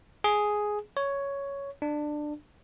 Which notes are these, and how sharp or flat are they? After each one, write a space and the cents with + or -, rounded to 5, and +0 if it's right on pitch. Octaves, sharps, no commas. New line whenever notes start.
G#4 +5
C#5 +5
D4 +20